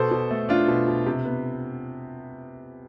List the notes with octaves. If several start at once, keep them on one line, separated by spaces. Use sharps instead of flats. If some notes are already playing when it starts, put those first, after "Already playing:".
Already playing: B2 A4 C5
B2
A3
A3 D4 F4
B2
B2
C3
B3